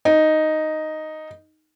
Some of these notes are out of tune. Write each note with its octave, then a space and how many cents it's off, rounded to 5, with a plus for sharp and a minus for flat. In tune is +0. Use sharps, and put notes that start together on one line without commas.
D#4 +0